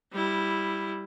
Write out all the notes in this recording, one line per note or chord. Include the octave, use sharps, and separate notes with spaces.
G3 E4